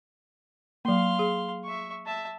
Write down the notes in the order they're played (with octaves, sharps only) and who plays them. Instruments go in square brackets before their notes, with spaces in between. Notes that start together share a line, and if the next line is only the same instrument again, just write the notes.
[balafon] F#3 A#3 [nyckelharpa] F5 C6
[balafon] G#4
[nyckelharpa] E5 C#6
E5 A5